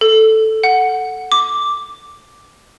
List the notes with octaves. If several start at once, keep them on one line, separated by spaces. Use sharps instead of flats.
A4
F#5
D6